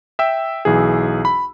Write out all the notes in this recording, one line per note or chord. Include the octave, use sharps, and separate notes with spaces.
E5 G5 E6
B1 E3 G#4
B5